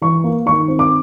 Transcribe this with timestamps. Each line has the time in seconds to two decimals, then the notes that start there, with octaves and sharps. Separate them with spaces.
0.02 E3 C#6
0.24 A#3
0.46 D#3 C#6
0.68 C4
0.79 D6